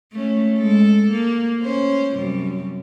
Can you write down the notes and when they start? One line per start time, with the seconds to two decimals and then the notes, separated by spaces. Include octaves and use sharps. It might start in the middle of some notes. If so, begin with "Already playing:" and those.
0.13 A3 C#4
0.57 G#3 A4
1.11 A#3
1.62 C#4 C5
2.15 F#2 C3 G3